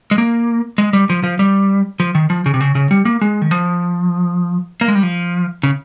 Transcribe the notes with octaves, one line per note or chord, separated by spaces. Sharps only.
G#3
A#3
G#3
G3
F3
F3
G3
F3
D#3
F3
C#3
C3
C#3
C#3
G3
A#3
G#3
D#3
F3
A#3
G#3
G3
F3
C#3